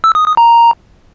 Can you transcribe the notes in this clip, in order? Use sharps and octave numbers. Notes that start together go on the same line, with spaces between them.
E6
D#6
D#6
A#5